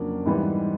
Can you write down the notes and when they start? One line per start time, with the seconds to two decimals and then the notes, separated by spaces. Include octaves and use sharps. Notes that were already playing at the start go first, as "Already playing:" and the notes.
Already playing: F2 C#3 F#3 A#3 D4
0.26 G#2 E3 G3 B3